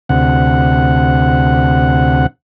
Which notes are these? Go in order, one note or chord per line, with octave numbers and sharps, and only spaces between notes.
D2 C3 F#5